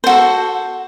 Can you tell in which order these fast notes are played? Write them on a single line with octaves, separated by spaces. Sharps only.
C5 F#4 A4